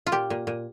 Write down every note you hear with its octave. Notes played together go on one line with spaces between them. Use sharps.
F4
A#2 G4
A#2
A#2